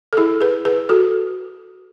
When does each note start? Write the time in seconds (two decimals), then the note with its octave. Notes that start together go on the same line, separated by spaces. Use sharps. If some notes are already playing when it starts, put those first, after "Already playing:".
0.13 A4
0.17 E4 G#4
0.41 G#4 B4
0.65 G#4 B4
0.89 F#4 A4